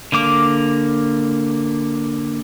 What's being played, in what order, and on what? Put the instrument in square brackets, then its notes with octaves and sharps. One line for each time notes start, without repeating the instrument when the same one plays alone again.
[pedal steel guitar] D3 A#3 D6